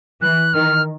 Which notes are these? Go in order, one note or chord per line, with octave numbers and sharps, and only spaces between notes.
E3 F#6
D#3 F6